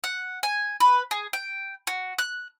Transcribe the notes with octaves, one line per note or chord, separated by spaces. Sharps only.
F#5
G#5
B4
G#4
G5
F#4
F#6